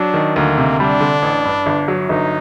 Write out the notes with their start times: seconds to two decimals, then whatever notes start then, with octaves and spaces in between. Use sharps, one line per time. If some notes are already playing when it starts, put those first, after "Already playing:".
Already playing: F#3 D4
0.14 D#3
0.36 D2 A#3
0.58 C3
0.80 G3 D4
1.01 D3
1.22 A1
1.45 G2
1.66 G1
1.88 F#3
2.09 G1 D#4